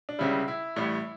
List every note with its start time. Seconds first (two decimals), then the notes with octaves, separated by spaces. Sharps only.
0.09 D4
0.19 C#2 C#3 G3 E4
0.48 E4
0.76 A1 A2 G3